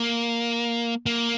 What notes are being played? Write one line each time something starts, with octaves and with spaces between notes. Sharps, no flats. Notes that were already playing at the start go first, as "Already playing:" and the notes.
Already playing: A#3
A#3